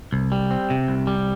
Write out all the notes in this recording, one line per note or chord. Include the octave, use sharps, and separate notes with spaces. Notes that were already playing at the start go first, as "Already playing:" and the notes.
C2
G3
C4
C3
C2
G3